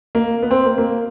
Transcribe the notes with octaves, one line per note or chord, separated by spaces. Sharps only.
A#3
B3
C4
A#3
A#3